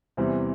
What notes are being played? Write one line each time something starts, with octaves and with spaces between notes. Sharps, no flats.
E2 C3 E3 G3 C4